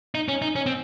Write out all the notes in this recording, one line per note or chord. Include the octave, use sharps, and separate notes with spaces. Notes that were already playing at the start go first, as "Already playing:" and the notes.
D#4
C#4
D#4
C#4
C4